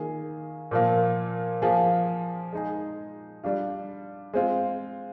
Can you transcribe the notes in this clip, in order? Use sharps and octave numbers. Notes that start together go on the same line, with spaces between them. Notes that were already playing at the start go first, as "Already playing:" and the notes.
Already playing: D#3 A#3 F4 G#4
A#2 F3 A#3
F3 A#3 F4 G#4
G#3 D#4 G#4
G3 D4 F4
G#3 C4 F4